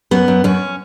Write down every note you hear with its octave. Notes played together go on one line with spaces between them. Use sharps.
F#2 B3
F#2
F#2 C#4